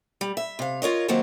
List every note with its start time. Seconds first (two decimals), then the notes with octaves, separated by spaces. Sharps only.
0.21 G3
0.37 E5
0.59 C3 F5
0.82 F4 A#4 C#5 D#5
1.08 D#3 F#3 A#3 C4 C5 C#5